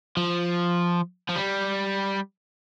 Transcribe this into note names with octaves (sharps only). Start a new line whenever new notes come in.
F3
F3
G3